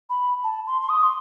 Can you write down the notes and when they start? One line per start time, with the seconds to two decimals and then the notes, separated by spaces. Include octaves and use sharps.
0.10 B5
0.44 A5
0.67 C6
0.82 C6
0.89 D#6
1.03 C6